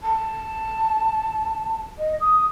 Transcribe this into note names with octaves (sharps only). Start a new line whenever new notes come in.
A5
D#5
D#6